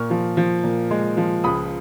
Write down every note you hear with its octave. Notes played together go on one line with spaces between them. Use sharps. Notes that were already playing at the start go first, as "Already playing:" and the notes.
Already playing: A#2 C#6 F6
F3
F3
A#2
G#3
F3
C#2 B5 D#6